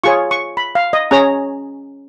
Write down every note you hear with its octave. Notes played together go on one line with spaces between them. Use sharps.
F4 G#4 C#5 C#6
C#6
B5
F5
D#5
C#4 G#4 C#5 A#5